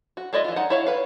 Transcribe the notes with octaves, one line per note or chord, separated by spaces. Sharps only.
F#4
G#3 E4 D5 D#5
E3 F4
D#4 F#5
E4 C#5 F5
B4 F5